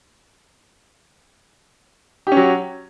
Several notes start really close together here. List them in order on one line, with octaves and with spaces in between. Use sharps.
G4 C#4 F#3